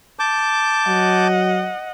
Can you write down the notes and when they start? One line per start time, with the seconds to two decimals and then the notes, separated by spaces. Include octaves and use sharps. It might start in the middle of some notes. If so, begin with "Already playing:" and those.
0.19 A5 D6 G6
0.87 F#3 D#5 F#5